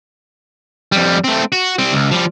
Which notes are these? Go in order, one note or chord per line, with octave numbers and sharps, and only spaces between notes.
F2 G3
A3 C4
F#4
G3 C4
C#2
F3 G3